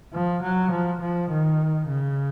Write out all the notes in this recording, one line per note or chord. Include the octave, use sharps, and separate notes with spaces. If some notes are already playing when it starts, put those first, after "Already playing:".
F3
F#3
F3
F3
D#3
C#3